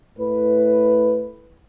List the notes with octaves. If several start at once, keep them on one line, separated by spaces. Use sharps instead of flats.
A2 B4